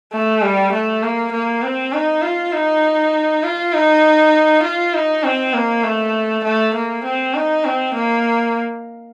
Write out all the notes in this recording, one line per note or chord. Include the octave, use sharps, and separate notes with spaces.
A3
G3
A3
A#3
A#3
C4
D#4
F4
D#4
F4
D#4
F4
D#4
C4
A#3
A3
A3
A#3
C4
D#4
C4
A#3